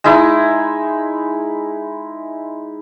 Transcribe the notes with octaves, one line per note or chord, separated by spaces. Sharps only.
G#3 D#4 E4